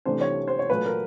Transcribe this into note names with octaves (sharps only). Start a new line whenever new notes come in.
C2 C3 E3 A3 D4 C5
C#5
C5
C#5
A#2 F#3 A3 B4
A#4